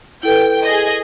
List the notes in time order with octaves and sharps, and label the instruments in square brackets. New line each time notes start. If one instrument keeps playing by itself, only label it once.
[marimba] E4 A4 B4 [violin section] G5
[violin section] G#4 D#5